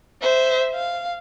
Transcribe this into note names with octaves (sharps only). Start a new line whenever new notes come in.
C5 E5
F5